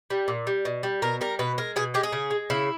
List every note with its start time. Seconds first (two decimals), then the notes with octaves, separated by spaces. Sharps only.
0.10 G3
0.28 A#2
0.47 G3
0.65 B2
0.83 G3
1.02 B2 A#4
1.21 G3 A#4
1.39 B2 B4
1.58 G#3 A#4
1.76 B2 G#4
1.94 G#3 G4
2.03 G#4
2.12 C#3
2.31 G#3
2.50 C#3 E4